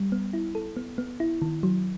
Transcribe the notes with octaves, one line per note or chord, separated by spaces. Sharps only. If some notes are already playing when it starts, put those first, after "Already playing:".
Already playing: G3
B3
E4
A4
B3
B3
E4
D#3
F#3